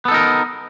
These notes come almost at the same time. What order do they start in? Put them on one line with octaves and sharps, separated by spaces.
B3 A4 D#4 A#4